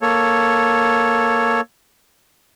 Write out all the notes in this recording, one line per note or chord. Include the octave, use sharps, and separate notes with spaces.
A#3 A4 C#5